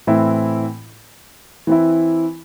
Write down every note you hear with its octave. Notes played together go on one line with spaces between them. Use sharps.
A2 E3 C4 E4
E3 C4 E4